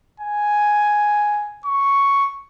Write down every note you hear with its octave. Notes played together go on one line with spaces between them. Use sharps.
G#5
C#6